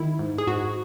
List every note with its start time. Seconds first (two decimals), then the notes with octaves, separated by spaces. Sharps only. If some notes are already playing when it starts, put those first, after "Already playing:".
Already playing: D#3 E4
0.19 G#2
0.38 G#4
0.47 G#2 F#4